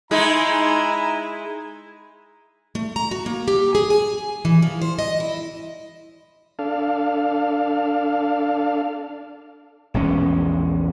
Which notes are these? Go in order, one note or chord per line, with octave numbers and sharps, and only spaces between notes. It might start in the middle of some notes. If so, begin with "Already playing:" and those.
G#3 D#4 E4 G#4 G#5 A#5
A3
A#5
F#4
A#3
G4
G#4
G#5
E3
F3
C5
D#5
E4
D4 A4 F5
A#1 E2 G#3 C#4